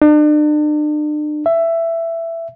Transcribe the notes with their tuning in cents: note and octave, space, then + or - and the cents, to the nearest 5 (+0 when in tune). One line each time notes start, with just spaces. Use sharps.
D4 +40
E5 +15